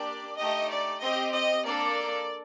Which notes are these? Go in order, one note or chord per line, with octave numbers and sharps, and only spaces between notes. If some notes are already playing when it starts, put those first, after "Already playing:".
Already playing: A#3 D4 G4 D5
A3 D#4 G4 D#5
D5
C4 G4 D#5
D#5
A#3 D4 A4 D5